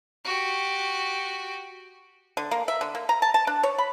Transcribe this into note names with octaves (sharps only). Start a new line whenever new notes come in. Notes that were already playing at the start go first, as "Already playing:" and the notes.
F#4 G4
D3
A#3
E5
D3
A#3
A#5
A5
A5
D4
C#5
B5